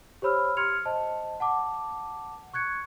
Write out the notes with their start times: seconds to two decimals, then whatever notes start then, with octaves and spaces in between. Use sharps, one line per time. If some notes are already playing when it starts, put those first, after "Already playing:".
0.22 G4 C5 C#5 B5 E6 F6
0.57 C6 F6 G#6 C#7 F7
0.85 C5 D#5 A5
1.40 F#5 A5 D6
2.54 C#6 F#6 G#6 C#7